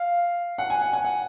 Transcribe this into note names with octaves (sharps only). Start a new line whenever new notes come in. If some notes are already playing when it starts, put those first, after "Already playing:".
Already playing: F5
F#5
G#5
F#5
G#5
F#5